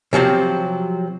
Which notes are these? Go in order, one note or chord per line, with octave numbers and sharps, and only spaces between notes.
C3 F3 F#3 C4